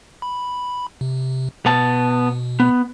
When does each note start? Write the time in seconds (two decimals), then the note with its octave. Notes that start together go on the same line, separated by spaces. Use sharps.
0.22 B5
1.01 C3
1.66 B2 B3 A5
2.60 B3